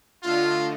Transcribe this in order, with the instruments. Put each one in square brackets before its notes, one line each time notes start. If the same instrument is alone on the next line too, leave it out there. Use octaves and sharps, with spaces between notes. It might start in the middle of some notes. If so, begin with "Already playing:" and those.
[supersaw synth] D3 A3 D4 A4 D#5 [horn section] F4